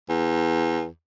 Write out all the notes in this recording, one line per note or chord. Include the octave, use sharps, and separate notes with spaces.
E2